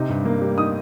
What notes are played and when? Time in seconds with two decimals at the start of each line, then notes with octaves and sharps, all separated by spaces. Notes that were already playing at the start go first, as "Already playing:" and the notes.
Already playing: C3 D#4
0.09 G2
0.25 A#3
0.41 G3
0.58 D#4 D#6